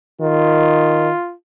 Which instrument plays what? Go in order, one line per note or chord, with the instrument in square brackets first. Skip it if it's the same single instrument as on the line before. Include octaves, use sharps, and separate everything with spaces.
[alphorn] D#3 [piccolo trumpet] F4